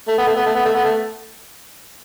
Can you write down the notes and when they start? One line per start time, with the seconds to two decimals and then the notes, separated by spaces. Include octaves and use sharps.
0.08 A3
0.18 B3
0.27 A3
0.36 B3
0.46 A3
0.55 B3
0.65 A3
0.75 B3
0.84 A3